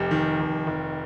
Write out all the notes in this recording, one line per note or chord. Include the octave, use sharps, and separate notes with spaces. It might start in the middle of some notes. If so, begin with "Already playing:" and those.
Already playing: F1 G4 G5
D#3
F1
F1